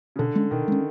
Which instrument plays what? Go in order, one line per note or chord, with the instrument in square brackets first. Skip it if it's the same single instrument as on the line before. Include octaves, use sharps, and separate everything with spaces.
[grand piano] C#3
[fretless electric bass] B2 [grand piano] D3
[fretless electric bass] G#3 C#4
[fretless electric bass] B2 [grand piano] D#3
[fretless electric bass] G#3 C#4